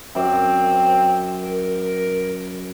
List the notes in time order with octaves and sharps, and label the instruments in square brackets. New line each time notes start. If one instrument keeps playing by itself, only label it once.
[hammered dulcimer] F#2 D5 [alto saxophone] C4
[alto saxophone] A#4